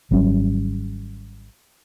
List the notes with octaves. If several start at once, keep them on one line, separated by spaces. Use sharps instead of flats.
G#1 F#3 G3 C#4